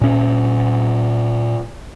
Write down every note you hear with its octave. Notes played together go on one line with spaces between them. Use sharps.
A#2 C#4